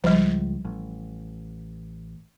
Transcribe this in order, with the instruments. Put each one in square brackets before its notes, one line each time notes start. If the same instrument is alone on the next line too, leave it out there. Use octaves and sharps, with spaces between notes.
[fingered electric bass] C#2 [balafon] F3 G3
[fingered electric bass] A1